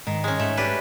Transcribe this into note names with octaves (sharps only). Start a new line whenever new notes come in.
G#2 D#3
G#3 C#4
G#2 A3
D4 G4 B4